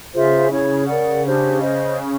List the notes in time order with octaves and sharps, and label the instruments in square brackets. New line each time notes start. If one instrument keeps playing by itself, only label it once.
[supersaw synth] C#3 [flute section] F4 G#4 C5 E5
[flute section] C#4 E4 G#4 C#5
A#4 D5 F#5
[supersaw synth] C#3 [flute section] D4 G4 C5
[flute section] C5 D#5